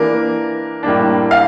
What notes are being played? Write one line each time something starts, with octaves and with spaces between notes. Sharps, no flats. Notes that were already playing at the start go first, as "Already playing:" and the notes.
Already playing: E3 A#3 D4 A#4
A2 G3 A#3 D4
F5